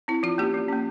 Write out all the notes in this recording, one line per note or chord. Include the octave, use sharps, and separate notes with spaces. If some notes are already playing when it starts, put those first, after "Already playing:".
C4 E4
F3 F4
A#3 C#4 G4
F3
A#3 C#4